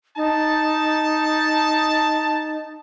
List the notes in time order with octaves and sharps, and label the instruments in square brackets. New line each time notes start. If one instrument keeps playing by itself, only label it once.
[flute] D#4 [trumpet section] A5